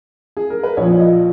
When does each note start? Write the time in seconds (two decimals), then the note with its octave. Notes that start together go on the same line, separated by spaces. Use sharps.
0.37 G#4
0.50 A#4
0.63 B4
0.77 A#1 A#2 F3 C#5
0.99 D#5